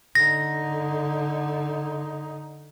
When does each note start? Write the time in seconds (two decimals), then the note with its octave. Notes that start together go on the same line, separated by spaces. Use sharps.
0.15 D3 D#4 A#6